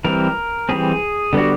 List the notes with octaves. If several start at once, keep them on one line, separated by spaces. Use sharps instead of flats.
E3 G3 C4 A#4
E3 G3 C4 G#4
D3 G3 B3 F#4